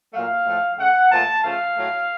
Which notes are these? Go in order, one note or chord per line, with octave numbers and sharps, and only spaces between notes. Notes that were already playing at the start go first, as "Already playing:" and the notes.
A#2 F#3 A3 F5
A2 F3 A3
C#3 A3 F#5
A#2 F3 A3 A5
C#3 F3 A3 F5
A2 F#3 A3